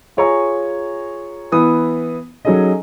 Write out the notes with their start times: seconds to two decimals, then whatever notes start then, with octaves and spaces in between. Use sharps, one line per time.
0.17 F4 G#4 C#5 G#5 A#5 C#6
1.52 E3 B3 D#6
2.45 F#3 C#4 D#4 G#4 A4 D#5